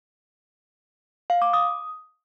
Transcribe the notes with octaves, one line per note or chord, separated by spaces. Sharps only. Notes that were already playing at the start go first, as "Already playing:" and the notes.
F5
D6
D#6